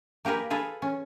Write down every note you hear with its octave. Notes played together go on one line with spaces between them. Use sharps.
A#3 G4 G#4 A#4 B4
F4 G#4 A4 B4
C#4